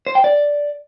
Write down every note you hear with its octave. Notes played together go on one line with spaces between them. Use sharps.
C5
G5
D5